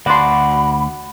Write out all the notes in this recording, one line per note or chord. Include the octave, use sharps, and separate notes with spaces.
D2 F#4 D5 F#5 A5 B5 C6